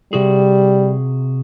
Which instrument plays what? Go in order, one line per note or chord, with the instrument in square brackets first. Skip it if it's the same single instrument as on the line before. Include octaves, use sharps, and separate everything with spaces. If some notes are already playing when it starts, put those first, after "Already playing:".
[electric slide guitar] C3 F#4 G#4 [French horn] G3